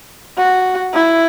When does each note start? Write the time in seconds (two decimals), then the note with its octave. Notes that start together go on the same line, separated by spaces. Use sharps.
0.37 F#4
0.93 E4